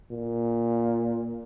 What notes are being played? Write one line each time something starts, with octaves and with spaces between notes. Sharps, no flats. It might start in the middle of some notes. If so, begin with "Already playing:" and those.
A#2